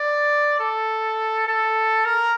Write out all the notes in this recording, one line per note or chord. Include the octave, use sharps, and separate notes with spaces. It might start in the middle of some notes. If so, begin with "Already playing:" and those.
Already playing: D5
A4
A4
A#4